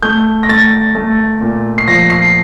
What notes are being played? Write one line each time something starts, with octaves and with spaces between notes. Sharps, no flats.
A3 G6
A#6
A3 A6
A3
A#2
C7
F3 A#6
C7